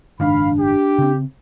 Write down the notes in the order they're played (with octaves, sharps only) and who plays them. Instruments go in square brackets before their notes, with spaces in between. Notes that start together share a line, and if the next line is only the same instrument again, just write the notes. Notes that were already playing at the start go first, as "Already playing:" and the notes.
[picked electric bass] F#1 G#2 D#3 [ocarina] D4 [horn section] F5 B5
[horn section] G4
[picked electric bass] C#3 C4